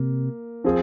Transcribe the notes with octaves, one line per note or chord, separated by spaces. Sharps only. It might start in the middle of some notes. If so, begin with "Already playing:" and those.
Already playing: C3 A#3
F3 C4 F4 G#4